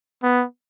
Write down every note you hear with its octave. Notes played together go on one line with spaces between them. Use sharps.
B3